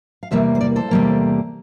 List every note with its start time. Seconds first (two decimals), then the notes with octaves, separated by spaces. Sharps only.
0.23 F5
0.31 E2 C3 E3 G3 A#3 C5 E5
0.55 C5
0.61 A#4 D5
0.76 A4 C5
0.91 E2 C3 E3 G3 A#3